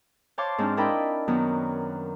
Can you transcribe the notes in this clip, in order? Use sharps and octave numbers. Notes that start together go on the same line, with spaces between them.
C5 C#5 F5 A5 C6 D6
G#2 C4 D4 F6
D4 E4 A#4 D#5 G5 B5
F#2 D#3 F#3 B3